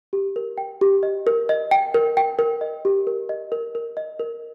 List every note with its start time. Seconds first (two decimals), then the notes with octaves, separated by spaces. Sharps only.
0.13 G4
0.36 A#4
0.58 G5
0.81 G4
1.03 D#5
1.27 A#4
1.49 D#5
1.71 G5
1.94 A#4
2.17 G5
2.39 A#4
2.61 D#5
2.85 G4
3.07 A#4
3.29 D#5
3.52 A#4
3.75 A#4
3.97 D#5
4.20 A#4